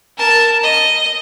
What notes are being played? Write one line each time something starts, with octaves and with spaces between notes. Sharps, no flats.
A#4 A5
D#5